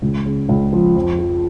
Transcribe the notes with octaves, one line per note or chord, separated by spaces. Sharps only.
C#2
C#3
C#2
F3
F2
F3